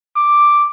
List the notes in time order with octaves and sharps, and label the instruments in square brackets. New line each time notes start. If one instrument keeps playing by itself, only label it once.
[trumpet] D6